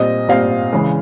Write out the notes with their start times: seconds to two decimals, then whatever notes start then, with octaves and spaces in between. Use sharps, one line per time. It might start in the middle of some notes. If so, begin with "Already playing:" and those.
Already playing: A#2 G3 C4 D#5
0.29 A#2 G3 C4 F5
0.73 C#3 E3 G#3